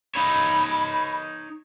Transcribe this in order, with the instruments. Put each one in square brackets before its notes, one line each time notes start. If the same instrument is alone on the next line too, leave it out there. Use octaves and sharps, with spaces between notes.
[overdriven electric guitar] D#4 C#5 [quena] B5